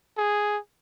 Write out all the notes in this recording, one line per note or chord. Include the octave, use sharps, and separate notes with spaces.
G#4